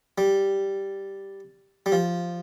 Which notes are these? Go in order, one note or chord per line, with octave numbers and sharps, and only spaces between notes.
G3
G3
F3